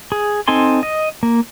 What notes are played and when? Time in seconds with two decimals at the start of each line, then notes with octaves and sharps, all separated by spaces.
0.12 G#4
0.48 C4 D#4 A4 G#5 C6
0.83 D#5
1.23 A#3